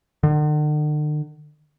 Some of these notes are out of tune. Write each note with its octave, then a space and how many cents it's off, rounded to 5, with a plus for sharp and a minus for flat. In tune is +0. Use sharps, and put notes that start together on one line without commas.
D3 +45